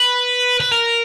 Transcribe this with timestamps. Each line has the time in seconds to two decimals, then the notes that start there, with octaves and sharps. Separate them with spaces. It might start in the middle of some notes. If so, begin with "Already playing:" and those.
Already playing: B4
0.60 B4
0.71 A#4